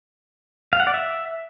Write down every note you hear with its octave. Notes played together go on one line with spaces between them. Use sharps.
F5
F#5
D5
E5